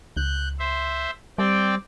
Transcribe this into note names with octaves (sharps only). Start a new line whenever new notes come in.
C#2 F#6 G6
C5 E5
G3 C4 D5 G5